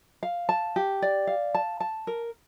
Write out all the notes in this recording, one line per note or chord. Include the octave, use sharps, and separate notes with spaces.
F5
A5
G4
D5
F5
A5
A5
A#4